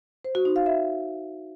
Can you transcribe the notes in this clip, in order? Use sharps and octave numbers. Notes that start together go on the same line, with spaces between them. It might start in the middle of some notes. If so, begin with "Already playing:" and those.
C5
F#4
D#4
F5
E5